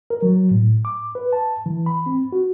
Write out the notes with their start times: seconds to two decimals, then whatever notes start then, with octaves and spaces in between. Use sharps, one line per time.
0.10 A#4
0.22 F#3
0.51 A2
0.85 D6
1.15 B4
1.33 A5
1.66 E3
1.86 B5
2.06 C4
2.32 F#4